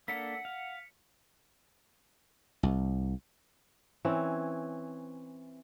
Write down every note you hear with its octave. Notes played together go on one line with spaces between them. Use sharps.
A#3 D4 A4 F#5 B6 C#7
F5
C2
E3 C4 C#4